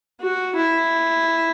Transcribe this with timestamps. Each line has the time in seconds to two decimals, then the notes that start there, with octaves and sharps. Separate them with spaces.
0.21 F#4
0.56 E4